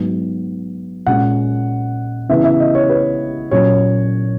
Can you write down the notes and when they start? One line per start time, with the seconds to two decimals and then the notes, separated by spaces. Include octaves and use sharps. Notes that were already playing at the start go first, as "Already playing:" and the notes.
Already playing: G#2 F#3 B3
1.07 A#2 G#3 C#4 F#5
2.29 C#3 E3 B3 E5
2.44 E5
2.60 D#5
2.75 C#5
2.90 B4
3.51 A#2 F#3 C#4 C#5